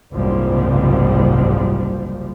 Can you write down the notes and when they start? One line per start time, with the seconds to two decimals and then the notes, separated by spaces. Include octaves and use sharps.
0.13 F#1 C2 G#2 F3 G3